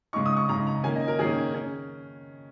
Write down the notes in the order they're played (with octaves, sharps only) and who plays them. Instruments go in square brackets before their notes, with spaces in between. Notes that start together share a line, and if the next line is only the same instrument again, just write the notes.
[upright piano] C#3 G#3 D#4 C#6
D#6
C#6
C#3 G#3 D#4 A#5
A#5
D#3 A#3 C#4 G#5
D#5
A#4
D#3 A#3 C#4 G#4
C#4